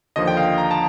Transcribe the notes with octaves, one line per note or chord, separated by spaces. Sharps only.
D#2 D3 F3 D#5
G5
F5
A#5
A5